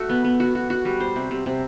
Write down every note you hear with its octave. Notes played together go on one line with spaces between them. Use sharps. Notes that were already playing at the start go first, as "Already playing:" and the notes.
Already playing: A3 F#4
B3
B3
F#4
F#4
F#4
G3
C5
C3
C3
C3